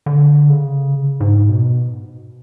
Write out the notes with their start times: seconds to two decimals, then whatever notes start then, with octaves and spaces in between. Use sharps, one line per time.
0.06 D3
0.49 C#3
1.20 G#2
1.49 B2